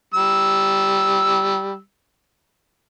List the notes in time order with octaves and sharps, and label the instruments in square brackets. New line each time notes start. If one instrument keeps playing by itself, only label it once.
[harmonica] G3 E6